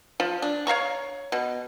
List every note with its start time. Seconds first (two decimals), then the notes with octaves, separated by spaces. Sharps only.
0.20 F3
0.42 D4
0.67 C#5 F5 A#5 C#6
1.32 B2